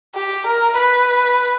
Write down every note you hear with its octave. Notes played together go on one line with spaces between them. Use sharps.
G4
A#4
B4